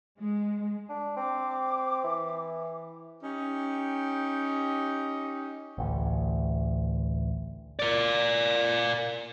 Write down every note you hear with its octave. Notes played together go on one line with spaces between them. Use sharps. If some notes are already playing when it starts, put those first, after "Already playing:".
G#3
D4
C4 D6
E3
C#4 D#4 G4
A1 D2
A#4 D5